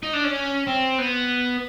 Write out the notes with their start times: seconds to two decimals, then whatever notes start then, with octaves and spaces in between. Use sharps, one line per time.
0.03 D#4
0.13 D4
0.24 C#4
0.67 C4
0.98 B3